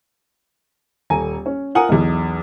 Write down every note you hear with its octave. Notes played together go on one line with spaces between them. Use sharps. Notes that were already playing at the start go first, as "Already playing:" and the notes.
D#1 A4 G#5 A#5
C#4
F4 A#4 F#5 G#5 D#6
B1 E2